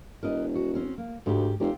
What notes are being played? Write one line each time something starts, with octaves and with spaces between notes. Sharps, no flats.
E1 A#4 B4 D#5
F#4
C4 C#4 F#4
A#3
D2 G#2 G4
F1 C4 F4 G4